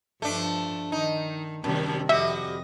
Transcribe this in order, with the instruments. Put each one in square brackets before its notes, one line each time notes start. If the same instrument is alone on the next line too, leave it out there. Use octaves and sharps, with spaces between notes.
[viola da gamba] G2 F3 [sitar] A3 D4
[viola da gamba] D#3 [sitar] D#4
[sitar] F#2 [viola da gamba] C3 D#3 G3
[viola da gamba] F2 D#5 [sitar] G3 F#4 [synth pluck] E5